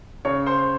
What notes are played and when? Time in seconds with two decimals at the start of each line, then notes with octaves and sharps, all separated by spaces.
0.25 C#3 C#5 C#6
0.46 C5 C6